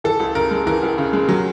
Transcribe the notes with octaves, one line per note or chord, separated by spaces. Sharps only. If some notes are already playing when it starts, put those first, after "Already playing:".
E3 A4
C#2
C#3 A#4
G#3
E3 A#4
C#2
C#3
G#3
F#3